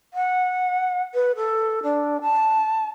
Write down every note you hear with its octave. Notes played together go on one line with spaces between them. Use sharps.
F#5
B4
A4
D4
A5